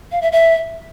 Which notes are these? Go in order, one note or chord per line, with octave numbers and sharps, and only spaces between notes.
F5
E5
E5